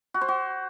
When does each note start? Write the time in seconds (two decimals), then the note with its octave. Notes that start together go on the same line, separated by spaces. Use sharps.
0.14 F#4
0.21 C5
0.28 F#4